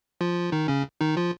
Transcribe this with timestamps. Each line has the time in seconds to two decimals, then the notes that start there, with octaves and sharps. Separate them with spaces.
0.21 F3 F4
0.52 D#3 D#4
0.68 C#3 C#4
1.01 D#3 D#4
1.17 F3 F4